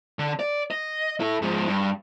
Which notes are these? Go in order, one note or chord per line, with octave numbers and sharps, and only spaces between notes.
D3
D5
D#5
E4 A4
G#2 F3
G2